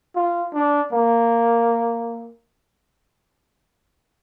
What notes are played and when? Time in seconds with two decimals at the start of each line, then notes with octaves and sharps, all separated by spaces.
0.16 F4
0.54 D4
0.93 A#3